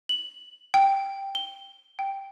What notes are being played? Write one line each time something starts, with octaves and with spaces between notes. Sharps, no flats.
F#7
G5
G7
G5